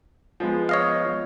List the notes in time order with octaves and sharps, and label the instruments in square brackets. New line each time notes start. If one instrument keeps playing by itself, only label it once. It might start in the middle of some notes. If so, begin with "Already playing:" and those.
[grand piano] F3 G#3 B3
[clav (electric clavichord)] C#5 D#5 F5